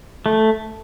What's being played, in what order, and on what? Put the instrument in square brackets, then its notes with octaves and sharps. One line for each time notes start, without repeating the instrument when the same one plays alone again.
[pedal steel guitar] A3